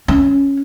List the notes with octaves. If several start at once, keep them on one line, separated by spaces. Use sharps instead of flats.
C#4